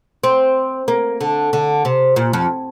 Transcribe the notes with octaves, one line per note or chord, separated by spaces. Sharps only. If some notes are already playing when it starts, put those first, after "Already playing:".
C4
A#3
D3
D3
C3
A#2
F2